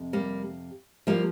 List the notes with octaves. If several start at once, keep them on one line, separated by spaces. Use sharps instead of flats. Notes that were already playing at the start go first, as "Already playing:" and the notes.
Already playing: F2 C3
G3 A#3
F3 G3 A#3